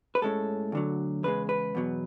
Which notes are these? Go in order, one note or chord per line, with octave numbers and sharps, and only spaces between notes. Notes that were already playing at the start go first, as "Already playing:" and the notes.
B4
A2 G#3 C#4 A4
D2 D3 F#3
E2 C#3 G#3 B4
B4
E2 B2 F#3